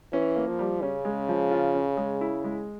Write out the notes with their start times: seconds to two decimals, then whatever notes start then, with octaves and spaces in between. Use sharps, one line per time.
0.13 E3 C#4
0.36 A#3
0.47 F3
0.59 G3
0.82 C#3 C#4
1.05 G#3
1.29 F3
1.51 F4
1.74 C#4
1.97 G#3
2.21 E4
2.44 G#3